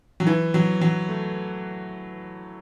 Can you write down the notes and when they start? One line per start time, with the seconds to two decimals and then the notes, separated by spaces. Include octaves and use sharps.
0.20 F#3
0.27 E3
0.54 F#3
0.81 F#3
1.09 A3